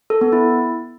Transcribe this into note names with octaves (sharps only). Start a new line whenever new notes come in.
A4
B3
E4